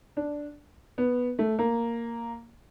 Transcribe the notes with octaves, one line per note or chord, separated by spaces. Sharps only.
D4
B3
A3
A#3